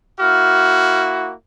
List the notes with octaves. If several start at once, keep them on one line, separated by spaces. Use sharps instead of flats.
A#3 E4 F#4 F6